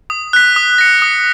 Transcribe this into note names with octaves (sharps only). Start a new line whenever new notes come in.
D#6
F#6 B6
D#6
A#6 C#7
D#6